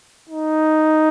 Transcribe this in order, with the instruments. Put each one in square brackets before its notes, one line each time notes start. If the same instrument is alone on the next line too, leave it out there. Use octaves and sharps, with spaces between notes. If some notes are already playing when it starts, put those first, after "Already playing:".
[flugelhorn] D#4